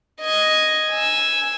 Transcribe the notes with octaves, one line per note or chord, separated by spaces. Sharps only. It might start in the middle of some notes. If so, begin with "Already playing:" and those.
D#5 G#6
G#5 E6